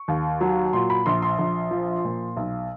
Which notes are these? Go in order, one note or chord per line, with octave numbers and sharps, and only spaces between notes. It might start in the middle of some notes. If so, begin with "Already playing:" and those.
Already playing: C#6
D#2
F#3
A#2 C6
B5
A#1 C6
C6
A#1
F3
A#2
B1